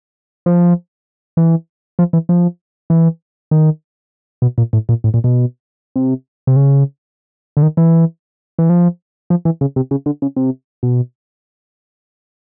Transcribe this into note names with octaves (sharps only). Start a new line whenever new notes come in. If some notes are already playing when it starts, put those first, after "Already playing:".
F3
E3
F3
E3
F3
E3
D#3
B2
A#2
A2
A#2
A2
A#2
B2
C3
C3
C#3
D3
D#3
E3
E3
F3
F3
E3
C#3
C3
C#3
D3
C#3
C3
B2